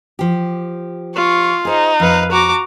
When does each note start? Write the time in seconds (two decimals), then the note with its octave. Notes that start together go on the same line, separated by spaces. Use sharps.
0.19 F3 G4
1.16 F4 C#6
1.65 D#4 G#4 C5
2.00 F2 B4 F5
2.32 F#4 A#5 D6